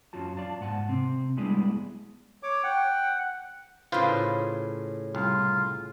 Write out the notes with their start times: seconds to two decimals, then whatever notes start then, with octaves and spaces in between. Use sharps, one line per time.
0.13 F#2 C#4 F4 F#4 A5
0.37 D5 F5 A5
0.61 G#2 F#5 A5
0.89 C3 C4
1.37 G3 G#3 B3 D4 E4 G#4
2.43 C#5 D6
2.63 F#5 G5
3.92 A2 C#3 F4 B4 C5
5.15 C2 F4